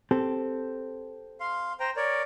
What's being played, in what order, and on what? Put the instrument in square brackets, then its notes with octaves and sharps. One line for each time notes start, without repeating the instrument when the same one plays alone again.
[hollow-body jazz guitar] C4 G4 A4
[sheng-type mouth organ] F5 C6
C5 G5 A#5
A#4 C#5 D5